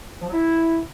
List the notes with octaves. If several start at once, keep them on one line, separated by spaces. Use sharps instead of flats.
F3
F#3
E4